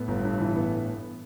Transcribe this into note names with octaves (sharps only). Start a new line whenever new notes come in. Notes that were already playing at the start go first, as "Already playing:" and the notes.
Already playing: A2 B3
G1
G2
E3
B3